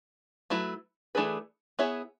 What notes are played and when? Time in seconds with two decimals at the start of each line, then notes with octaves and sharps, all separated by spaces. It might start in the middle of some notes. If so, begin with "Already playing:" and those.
0.50 F#3 A3 E4 B4
1.15 E3 A3 D4 G#4 B4
1.79 B3 E4 G#4 C#5 E5